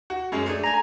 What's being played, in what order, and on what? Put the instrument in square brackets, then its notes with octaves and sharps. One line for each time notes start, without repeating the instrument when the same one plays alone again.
[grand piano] F#4
F#2 G#3 C#4
[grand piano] A3 D4 [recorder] G#4
[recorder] G#5 [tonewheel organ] A#5